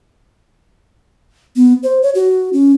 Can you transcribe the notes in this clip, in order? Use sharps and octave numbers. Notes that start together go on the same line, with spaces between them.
B3
C5
C#5
F#4
C#4